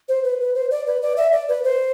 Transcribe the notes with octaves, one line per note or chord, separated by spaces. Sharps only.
C5
B4
B4
C5
D5
B4
D5
E5
D5
B4
C5